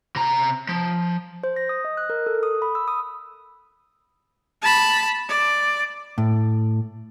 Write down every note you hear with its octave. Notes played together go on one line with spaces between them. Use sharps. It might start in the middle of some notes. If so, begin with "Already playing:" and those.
C3 A#5
F3
C5
A#6
D#6
D#5
F#6
A#4
A4
D#6
B5
E6
D#6
A5 B5
D5
A2